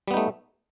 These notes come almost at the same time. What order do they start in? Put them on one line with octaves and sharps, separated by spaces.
G3 B3 D#4 A3